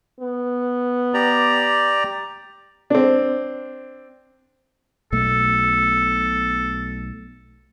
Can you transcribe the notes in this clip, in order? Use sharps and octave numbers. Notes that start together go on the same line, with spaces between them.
B3
G4 D5 A#5
C4 D4
B1 B2 A3 A4